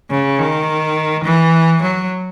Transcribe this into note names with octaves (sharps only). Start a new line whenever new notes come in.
C#3
D#3
E3
F#3